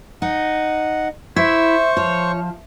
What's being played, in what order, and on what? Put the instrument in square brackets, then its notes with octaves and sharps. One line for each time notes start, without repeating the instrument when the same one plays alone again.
[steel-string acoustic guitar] D#4 [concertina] F#5
[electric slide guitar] E4 [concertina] C5 C#6 [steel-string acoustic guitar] E5
[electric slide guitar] F3 [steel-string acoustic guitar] C#5